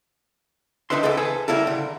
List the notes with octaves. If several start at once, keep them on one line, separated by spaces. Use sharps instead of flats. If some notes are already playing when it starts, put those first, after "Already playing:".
D#3 D4 D#4 B4 E5 C6
C#2 C#3 E3 A4 D#5 E5
G#4 A4 B4
C#3 E3 G3 A#3 E4 A4
D3